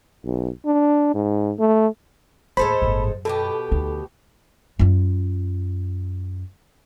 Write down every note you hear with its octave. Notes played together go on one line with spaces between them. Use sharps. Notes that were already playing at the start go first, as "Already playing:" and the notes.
B1
D4
G#2
A3
D#2 A2 G#3 A4 C5 B5
G1 A2
F#2
B2 B3 G4 A4
D2 D#4
F#2 F4